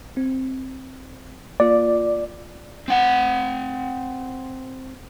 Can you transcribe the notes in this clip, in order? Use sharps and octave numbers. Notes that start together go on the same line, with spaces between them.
C4
A#3 F4 D5
C4 F#5